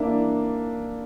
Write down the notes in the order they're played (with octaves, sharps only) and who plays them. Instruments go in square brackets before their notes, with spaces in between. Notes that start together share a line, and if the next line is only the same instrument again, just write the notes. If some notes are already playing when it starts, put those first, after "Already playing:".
Already playing: [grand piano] A#3 D4 E4